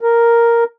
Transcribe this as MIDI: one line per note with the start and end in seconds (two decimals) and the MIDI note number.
0.01 0.64 70